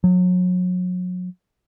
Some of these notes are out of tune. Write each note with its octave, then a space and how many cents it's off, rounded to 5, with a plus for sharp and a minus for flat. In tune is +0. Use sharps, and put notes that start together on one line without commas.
F#3 -35